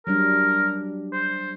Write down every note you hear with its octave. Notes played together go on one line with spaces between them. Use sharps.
F#3 G3 D4 A#4
C5